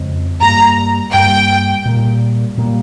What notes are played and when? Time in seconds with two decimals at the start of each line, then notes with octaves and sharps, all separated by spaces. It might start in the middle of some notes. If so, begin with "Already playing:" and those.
Already playing: F2 C#3 G#3 C4
0.41 G2 G3 A#3 A#5
1.13 G2 G3 A#3 G5
1.85 A#2 G3 A#3
2.57 A#2 G3 A#3